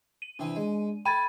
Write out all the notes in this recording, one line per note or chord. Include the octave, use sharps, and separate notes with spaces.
D#7
C3 E3 C4 D4
G#3
A4 G5 B5 G#6 A6